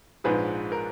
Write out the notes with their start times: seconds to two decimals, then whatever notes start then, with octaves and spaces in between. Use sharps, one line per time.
0.24 A#1 G#2 F3 G#3 G#4 B4
0.72 A#4